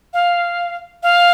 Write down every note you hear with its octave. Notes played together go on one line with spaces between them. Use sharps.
F5
F5